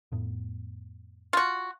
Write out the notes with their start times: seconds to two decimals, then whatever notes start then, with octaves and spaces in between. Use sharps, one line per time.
0.12 F2 A2 B3
1.33 F4 F#4